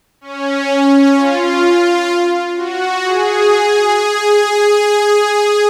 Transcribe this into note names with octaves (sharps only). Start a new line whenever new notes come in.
C#4
F4
F#4
G#4